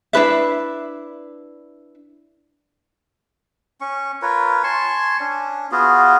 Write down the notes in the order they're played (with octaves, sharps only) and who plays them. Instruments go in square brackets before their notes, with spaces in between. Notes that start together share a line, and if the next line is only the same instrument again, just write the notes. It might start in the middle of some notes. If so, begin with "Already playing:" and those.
[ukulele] D4 E4 B4 E5
[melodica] C#4 C#6
F4 A#4 B4 C#5
G#5 A5 C6 C#6
C#4 D4
B3 F4 F#4 G#4